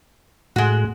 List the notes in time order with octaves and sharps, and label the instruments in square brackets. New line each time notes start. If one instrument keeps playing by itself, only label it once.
[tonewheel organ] A2 [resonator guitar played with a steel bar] G#3 F#4